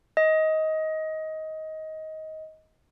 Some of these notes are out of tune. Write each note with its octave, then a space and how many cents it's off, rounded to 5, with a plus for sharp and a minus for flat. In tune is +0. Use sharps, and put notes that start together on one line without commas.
D#5 +20